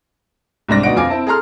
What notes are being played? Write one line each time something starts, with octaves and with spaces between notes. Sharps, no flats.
C2 G#2 D4 A#6
D2 B2 D#4 D5 F#5 D7
F2 F4 G#5 D6 D7
C4 E4 A5
G#4 A4 A#5 C6 F6